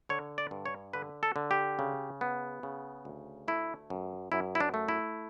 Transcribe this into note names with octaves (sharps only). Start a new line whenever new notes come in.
D3 C#5
D5
G2
C#5
D3 B4
A4
D3
G4
C#3
B3
C#3
D2
A3 E4
F#2
F#2 E4
E4
D4
A3
E4